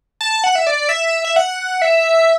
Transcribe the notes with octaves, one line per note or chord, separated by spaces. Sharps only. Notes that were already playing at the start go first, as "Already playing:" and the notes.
A5
F#5
E5
D5
E5
E5
F#5
E5